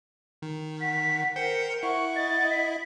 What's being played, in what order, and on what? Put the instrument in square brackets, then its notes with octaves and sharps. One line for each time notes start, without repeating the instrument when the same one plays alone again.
[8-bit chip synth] D#3
[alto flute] F#5 [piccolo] B6
[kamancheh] A#4 [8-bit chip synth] C5 G5 C6 [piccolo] C#7
[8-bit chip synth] E4 [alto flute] F#5 [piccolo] C#6
[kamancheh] D#5 [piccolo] A6
[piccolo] B6